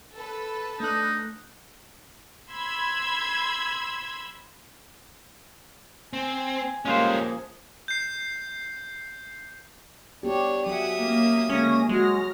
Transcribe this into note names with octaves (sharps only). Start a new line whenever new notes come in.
A4 B4
A3 D4 D#4 F#6
B5 C6 E6 G#6
C4 G#5
F3 G3 G#3 A#3 C#4 F4 G#4 C5
G6 C7
B3 D4 G4 C#5
F#3 G#4 E5 F#5 D#6
A#3 C#4
D3 G#3 A#3 C#4 A#6
F#3 G#3 F#4 F6 A#6